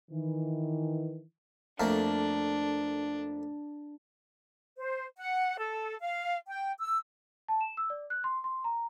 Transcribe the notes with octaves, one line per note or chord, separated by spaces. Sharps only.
D#3 E3
F2 A3 A#3 D4
C5
F#5
A4
F5
G5
E6
A5
E7
E6
D5
F#6
C6
C6
A#5